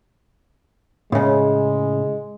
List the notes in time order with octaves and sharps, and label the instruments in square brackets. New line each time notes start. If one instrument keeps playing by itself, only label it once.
[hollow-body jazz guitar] A2 C#3 [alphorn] G#3